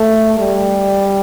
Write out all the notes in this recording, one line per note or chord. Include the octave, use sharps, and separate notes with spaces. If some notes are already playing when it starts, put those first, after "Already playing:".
Already playing: A3
G3